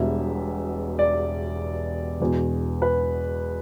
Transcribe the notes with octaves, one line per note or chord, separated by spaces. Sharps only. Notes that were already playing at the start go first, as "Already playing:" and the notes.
Already playing: E1 E2 B2 G3 E5
D5
E1 E2 B2
B4